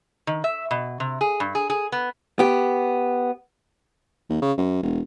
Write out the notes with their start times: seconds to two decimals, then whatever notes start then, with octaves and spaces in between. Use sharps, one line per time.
0.27 D#3
0.44 E5
0.71 B2
1.00 C3
1.21 G#4
1.40 G2
1.55 G#4
1.70 G#4
1.92 B3
2.39 B3 G4
4.29 D#2
4.42 C#3
4.57 F#2
4.83 E1